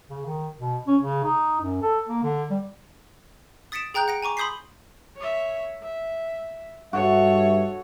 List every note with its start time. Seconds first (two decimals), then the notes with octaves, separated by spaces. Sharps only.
0.09 C#3
0.26 D#3
0.58 B2
0.87 C#4
1.02 C#3
1.24 D#4
1.61 F#2
1.82 A4
2.09 A#3
2.23 D3
2.50 G3
3.72 D#6 A6 B6 C#7 D7 E7
3.94 G#4 G5 A#5 F#6 G6
4.08 F#5 A#6 D7
4.23 G#5 A#5 C#6 D6
4.37 B5 C6 D#6 G6 B6 C7
5.16 C#5 E5
5.83 E5
6.93 G2 F#4 A4 C#5 E5